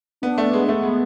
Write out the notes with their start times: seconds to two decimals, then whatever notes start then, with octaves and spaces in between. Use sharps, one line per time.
0.22 B3 D4
0.38 A3
0.46 B3
0.53 G#3
0.68 A3 B3
0.83 G#3